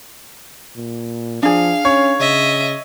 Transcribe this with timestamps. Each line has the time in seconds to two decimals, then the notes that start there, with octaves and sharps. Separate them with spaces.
0.76 A#2
1.43 F3 D4 G#4 F5
1.85 C#4 C#5
2.20 C#3 D#5 E5